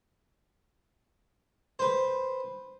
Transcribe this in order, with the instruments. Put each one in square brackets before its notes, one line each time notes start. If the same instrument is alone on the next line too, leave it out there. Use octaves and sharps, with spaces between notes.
[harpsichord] B4 C5